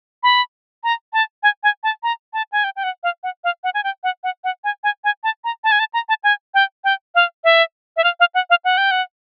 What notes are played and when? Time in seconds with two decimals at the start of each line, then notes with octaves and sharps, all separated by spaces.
0.23 B5
0.84 A#5
1.13 A5
1.43 G#5
1.63 G#5
1.83 A5
2.03 A#5
2.33 A5
2.52 G#5
2.64 G5
2.76 G5
2.84 F#5
3.03 F5
3.23 F#5
3.44 F5
3.64 F#5
3.74 G#5
3.84 G5
4.04 F#5
4.24 F#5
4.44 F#5
4.64 G#5
4.84 G#5
5.04 G#5
5.24 A5
5.44 A#5
5.64 A5
5.72 G#5
5.79 A5
5.94 A#5
6.09 A5
6.24 G#5
6.54 G5
6.84 G5
7.15 F5
7.44 E5
7.97 E5
8.04 F5
8.20 F5
8.35 F#5
8.50 F5
8.65 F#5
8.78 G5
8.91 F#5